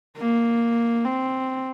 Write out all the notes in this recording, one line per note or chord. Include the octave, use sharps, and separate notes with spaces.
A#3
C4